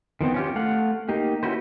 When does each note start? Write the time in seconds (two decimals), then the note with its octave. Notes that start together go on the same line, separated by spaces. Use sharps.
0.21 D#3 F3 B3 C4
0.34 C#4 F4 G4
0.56 A3 F5 F#5
1.09 A#3 D#4 G4
1.43 C#4 E4 F#4 B4 C5